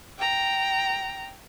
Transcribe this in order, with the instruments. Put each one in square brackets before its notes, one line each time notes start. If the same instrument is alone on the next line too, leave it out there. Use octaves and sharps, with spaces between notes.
[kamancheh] G5 A#5